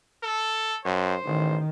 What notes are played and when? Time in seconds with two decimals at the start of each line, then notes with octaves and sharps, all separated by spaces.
0.23 A4
0.85 F#2 C5
1.25 A1 D#3